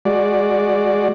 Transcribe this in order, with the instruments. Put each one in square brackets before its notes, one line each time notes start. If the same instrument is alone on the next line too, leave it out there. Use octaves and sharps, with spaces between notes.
[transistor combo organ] G#3 F#4 D5